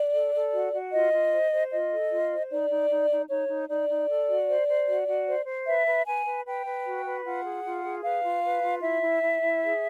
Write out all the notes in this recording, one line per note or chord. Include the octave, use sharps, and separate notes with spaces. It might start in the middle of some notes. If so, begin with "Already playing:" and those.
Already playing: D5
A4
A4
F#4
F#4
F4 D#5
F4
C5
C5
F4 D#5
A4
F4
C5
D#4 D5
D#4
D#4
D#4
D#4 C#5
D#4
D#4 D5
D#4
A4
F#4
C5
C5
F#4
F#4
C5
C5
B4 E5
B4
B4 G#5
B4
B4 G5
B4
F#4
B4
F4 F#5
G#4
F4
G#4
B4 F5
F4
B4
F4
E4 E5
E4
E4
E4
G#4